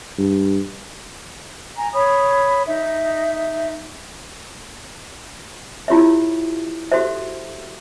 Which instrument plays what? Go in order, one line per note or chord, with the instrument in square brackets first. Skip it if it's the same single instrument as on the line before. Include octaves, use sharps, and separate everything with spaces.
[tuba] G2
[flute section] G#5 A#5
C#5 B5 D#6
D#4 E5
[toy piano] E4 F4 G4 C#5 E5
F#4 G4 A4 C5 E5